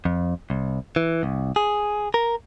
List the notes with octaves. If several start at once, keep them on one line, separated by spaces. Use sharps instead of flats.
F2
C2
E3
C2
G#4
A#4